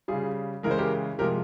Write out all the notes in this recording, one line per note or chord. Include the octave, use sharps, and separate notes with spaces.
C#3 G3 F4 G#4
C#3 E3 G#3 A#4
C5
G4 A#4
C3 F3 G#3 G4 A#4